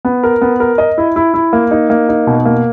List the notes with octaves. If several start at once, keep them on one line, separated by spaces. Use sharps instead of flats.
B3
A#4
B3
A#4
D#5
E4
E4
E4
A#3
D#4
A#3
D#4
B2
A#3